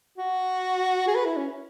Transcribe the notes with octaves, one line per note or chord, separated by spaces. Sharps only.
F#4
G#4
B4
E4
C#4